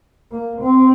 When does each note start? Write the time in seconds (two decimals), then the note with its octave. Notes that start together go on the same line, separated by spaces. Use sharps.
0.32 A#3
0.62 C4